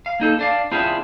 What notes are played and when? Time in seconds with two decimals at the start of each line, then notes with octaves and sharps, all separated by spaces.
0.06 F5
0.20 A#3 D#4 A4
0.39 D4 D5 F5
0.72 C4 D4 E4 F4 G#4